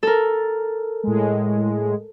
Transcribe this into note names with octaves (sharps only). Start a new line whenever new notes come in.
A4 A#4
A2 G#3